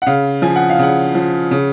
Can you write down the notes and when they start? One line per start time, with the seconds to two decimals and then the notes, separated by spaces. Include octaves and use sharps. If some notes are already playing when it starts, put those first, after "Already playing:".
0.02 F#5
0.06 C#3 F5
0.42 F3 G#5
0.56 F#5
0.70 F5
0.79 C#3 F#5
1.15 F3
1.51 C#3